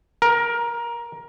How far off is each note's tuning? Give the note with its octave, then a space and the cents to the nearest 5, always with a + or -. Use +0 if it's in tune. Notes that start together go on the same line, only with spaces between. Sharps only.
A#4 +15